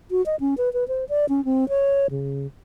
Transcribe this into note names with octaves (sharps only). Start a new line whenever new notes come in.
F#4
D#5
C#4
B4
B4
C5
D5
C#4
C4
C#5
C#3